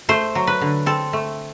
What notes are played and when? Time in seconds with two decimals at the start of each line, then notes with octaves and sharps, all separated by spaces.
0.09 A3 C5
0.35 F#3
0.47 B4
0.61 D3
0.86 C4 A4
1.13 A3